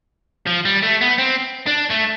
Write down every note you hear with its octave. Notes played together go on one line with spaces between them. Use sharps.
F3
G3
A3
B3
C4
D4
A3